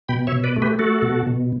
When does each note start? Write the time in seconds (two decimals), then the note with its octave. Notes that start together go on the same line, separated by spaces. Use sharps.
0.09 B2 G5 B5
0.27 C#5 E5
0.32 B2
0.44 B4 D5
0.56 A3
0.62 G4 B4
0.79 A3 F#4 A4
1.02 B2
1.27 B2